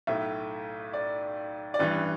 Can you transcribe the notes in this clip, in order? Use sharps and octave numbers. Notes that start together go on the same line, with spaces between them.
B1 A2 A3 E5
D5
D5
A1 G2 E3 B4